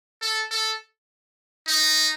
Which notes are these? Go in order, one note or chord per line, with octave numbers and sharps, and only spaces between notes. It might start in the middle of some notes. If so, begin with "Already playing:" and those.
A4
A4
D#4